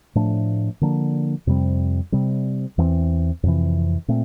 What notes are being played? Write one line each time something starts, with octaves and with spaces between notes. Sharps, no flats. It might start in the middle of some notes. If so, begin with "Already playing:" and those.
A2 F3 A3 D4
D3 F3 A#3 D4
F2 C3 G3 C4
C3 G3 C4
E2 E3 A3 C4
F2 C3 E3
A#2 A3 C4